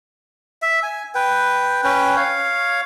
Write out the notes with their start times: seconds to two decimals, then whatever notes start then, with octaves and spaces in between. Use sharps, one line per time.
0.62 E5
0.83 G#5
1.15 B4 G5
1.84 C#4 B4 G5
2.17 C#5 F5